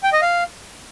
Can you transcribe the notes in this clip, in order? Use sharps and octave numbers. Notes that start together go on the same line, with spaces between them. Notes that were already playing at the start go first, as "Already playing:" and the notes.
G5
D#5
F5